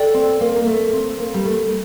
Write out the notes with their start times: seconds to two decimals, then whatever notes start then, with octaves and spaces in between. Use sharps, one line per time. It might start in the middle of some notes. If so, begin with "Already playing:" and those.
Already playing: A4 D5 G5
0.14 C4
0.41 A#3
0.56 A#3
0.67 A3
0.93 C4
1.20 A#3
1.34 G3
1.45 A3